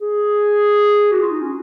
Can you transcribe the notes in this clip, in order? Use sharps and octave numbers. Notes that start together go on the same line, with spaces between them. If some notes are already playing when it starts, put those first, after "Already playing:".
G#4
F#4
F4
D#4
C#4